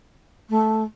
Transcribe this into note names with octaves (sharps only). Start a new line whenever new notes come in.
A3